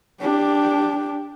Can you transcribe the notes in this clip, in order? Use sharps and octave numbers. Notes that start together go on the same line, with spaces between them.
D4 G4